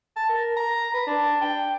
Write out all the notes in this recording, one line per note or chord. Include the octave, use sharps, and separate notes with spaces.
A5
A#4
A#5
B4
D4
G5